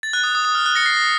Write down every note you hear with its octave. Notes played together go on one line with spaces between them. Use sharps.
A6
F#6
D#6
D#6
D#6
F6
F#6
A#6 C#7
C7
A#6